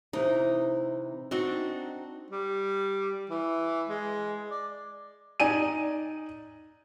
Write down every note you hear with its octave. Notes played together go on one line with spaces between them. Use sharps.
C3 E3 D#4
C4 D4 D#4 F#4
G3
E3
G#3
D5
D#4 D5 G#5 D#7